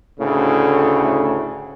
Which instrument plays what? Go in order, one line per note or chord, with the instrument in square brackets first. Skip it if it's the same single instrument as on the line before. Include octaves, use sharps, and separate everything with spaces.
[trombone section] D2 A2 C#3